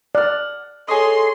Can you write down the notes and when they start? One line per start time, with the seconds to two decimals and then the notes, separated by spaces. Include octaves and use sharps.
0.15 D5 F#5 F6
0.88 G#4 A4 C#5 D#5 C6